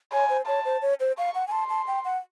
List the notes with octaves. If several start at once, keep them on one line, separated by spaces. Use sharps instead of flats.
C#5 G#5
C5
C#5 A5
C5
C#5
C5
F5 C#6
F#5
G#5
A5 C6
A5
G5
F#5